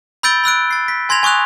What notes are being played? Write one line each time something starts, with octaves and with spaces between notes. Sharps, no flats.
B5 E6 G6 A6 D7 G7
B5 E6 F#6 D7
A6 C7
B6
G#5 C6 G#6 A#6 F7
G#5 C#6 D#6 F#6 F7